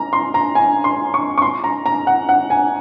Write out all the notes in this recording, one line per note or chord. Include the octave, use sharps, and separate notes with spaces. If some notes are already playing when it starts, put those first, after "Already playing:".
Already playing: A#5
C6
A#5
G#5
C6
C#6
C#6
C6
A#5
A#5
F#5
F#5
G#5